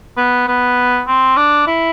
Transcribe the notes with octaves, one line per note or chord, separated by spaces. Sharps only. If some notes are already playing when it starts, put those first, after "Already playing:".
B3
B3
C4
D4
E4